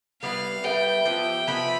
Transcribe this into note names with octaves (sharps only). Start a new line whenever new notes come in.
G3 B3 E4 B4 F5
G3 B3 E4 B4 G5
F3 B3 E4 G4
F3 B3 E4 G4 B5